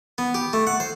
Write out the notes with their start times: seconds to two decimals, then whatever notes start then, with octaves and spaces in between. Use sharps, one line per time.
0.18 B3
0.34 G4
0.53 A3
0.67 F#5
0.80 C5